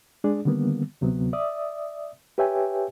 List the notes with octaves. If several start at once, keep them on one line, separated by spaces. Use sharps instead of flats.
G#3 D4 G#4 D5
D3 D#3 G3 A#3 B3
D2 C3 F#3 B3
D5 E5 D#6
G4 B4 C#5 E5 G5 G#5